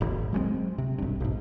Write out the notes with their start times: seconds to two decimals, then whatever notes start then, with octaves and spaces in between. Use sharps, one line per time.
0.01 D#1 G#1 D#2
0.33 F#3 G#3 A3 C4
0.78 C3
0.98 B1 G2
1.20 B1 G#2